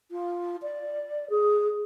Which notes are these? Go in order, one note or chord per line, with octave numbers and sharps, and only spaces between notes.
F4
D5
G#4